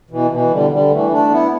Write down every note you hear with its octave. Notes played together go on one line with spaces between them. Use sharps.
B2 E3
B2 E3
D3 G3
D3 G3
E3 A3
A3 D4
B3 E4